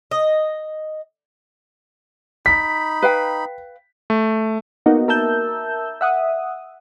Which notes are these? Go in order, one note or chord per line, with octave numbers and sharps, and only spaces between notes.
D#5
D#4 B5 B6
B4 F5 G5
A3
A#3 B3 D#4 F#4
A#4 E5 A5 E6 G6
E5 F#5 D#6